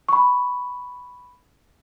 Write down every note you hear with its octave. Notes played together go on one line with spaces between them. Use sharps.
B5 C#6